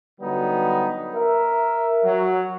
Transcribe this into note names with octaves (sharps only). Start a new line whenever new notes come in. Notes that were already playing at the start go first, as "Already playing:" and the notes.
D3 F#3 G3 B3 D#4
A#4 E5
F#3